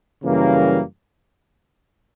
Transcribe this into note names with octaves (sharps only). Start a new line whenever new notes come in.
F#2 C#3 E3 G3 A#3